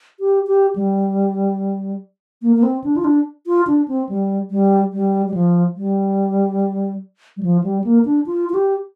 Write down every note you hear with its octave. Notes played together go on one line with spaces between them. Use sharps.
G4
G4
G3
A#3
A#3
C4
D4
F4
D4
F4
D4
C4
G3
G3
G3
G3
F3
G3
G3
F3
G3
A#3
D4
F4
F4
G4